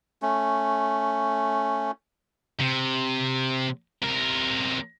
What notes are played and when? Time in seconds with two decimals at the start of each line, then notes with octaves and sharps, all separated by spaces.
0.22 A3 C#4
2.60 C3
4.03 C3 A#4